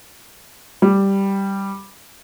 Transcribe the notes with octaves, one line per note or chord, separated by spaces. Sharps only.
G3